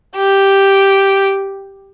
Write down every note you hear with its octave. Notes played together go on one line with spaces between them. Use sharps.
G4